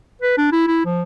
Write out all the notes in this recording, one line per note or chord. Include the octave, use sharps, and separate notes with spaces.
B4
D4
E4
E4
F3